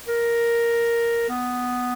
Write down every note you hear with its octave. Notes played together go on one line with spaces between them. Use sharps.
A#4
B3